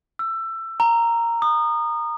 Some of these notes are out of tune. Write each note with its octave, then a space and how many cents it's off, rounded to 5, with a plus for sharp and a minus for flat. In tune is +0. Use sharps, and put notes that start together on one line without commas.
E6 +20
A#5 -5
D#6 -25